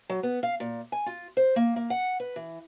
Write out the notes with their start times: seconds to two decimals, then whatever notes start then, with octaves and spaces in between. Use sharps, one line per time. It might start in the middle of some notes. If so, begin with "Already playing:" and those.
0.10 F#3
0.23 B3
0.43 F5
0.60 A#2
0.92 G#5
1.06 F4
1.37 C5
1.56 A#3
1.76 A#3
1.90 F#5
2.20 B4
2.36 E3